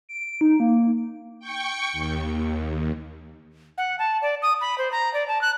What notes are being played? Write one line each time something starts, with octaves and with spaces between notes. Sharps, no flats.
D7
D#4
A#3
G5 C#6 C#7
D#2
F#5
A5
D5
D#6
B5
C5
A#5
D5
A5
F#6